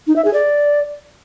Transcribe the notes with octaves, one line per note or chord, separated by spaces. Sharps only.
D#4
E5
G#4
D5